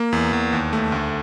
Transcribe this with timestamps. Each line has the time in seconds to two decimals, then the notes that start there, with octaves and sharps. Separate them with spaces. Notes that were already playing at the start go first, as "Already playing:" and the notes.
Already playing: A#3
0.13 E2
0.33 E2
0.53 D#2
0.73 A3
0.92 D2